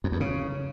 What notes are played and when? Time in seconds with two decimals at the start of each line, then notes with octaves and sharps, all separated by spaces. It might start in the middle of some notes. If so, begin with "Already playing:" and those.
0.04 F2
0.12 E2
0.20 C#3